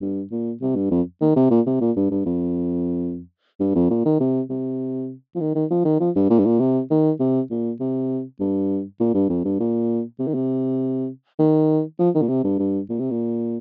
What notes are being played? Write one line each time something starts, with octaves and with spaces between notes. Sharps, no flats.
G2
A#2
C3
G2
F2
D#3
C3
A#2
C3
A#2
G2
G2
F2
G2
F2
A#2
D#3
C3
C3
F3
D#3
D#3
F3
D#3
F3
G2
A#2
G2
A#2
C3
D#3
C3
A#2
C3
G2
A#2
G2
F2
G2
A#2
C3
D#3
C3
D#3
F3
D#3
A#2
C3
G2
G2
A#2
C3
A#2